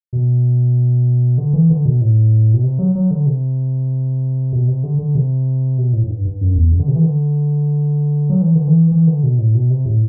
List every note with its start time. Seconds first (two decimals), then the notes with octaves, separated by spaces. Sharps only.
0.13 B2
1.38 D3
1.53 E3
1.70 D3
1.86 B2
2.01 A2
2.54 B2
2.63 C3
2.79 F#3
2.95 F#3
3.11 D3
3.26 C3
4.52 B2
4.68 C3
4.84 D3
4.99 D3
5.15 C3
5.78 B2
5.93 A2
6.04 A2
6.09 G2
6.25 G2
6.41 F#2
6.56 E2
6.72 F#2
6.80 D3
6.88 C3
6.96 E3
7.04 D3
8.30 F#3
8.42 E3
8.55 D3
8.68 E3
8.91 E3
9.07 D3
9.23 B2
9.38 A2
9.55 B2
9.70 C3
9.86 A2